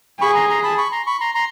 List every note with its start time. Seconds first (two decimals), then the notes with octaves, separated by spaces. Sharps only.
0.21 G#4 B5 C#6
0.35 A#5 C6
0.50 A#5 C6
0.63 A5 B5
0.78 B5 C#6
0.92 A#5 C6
1.07 B5 C#6
1.20 A#5 C6
1.35 A#5 C6